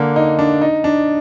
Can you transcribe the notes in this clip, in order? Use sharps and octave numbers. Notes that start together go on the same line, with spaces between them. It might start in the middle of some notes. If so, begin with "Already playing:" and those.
Already playing: D3 A#3
D#4
D4
D#4
D4